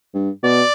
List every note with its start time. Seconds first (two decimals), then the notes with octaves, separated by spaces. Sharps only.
0.14 G2
0.43 B2 D5